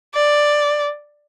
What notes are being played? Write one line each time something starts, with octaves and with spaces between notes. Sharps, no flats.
D5